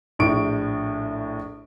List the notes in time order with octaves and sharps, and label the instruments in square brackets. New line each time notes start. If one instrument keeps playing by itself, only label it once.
[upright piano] A#1 A2 C#6 D7